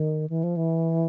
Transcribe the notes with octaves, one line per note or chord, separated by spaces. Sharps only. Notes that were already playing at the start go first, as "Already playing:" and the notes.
Already playing: D#3
E3
F3
E3